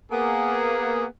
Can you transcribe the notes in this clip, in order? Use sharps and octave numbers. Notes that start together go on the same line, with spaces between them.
A#3 B3 G#4